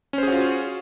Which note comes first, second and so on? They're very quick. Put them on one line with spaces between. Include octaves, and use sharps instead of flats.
C#4 C5 G#4 F#4 F4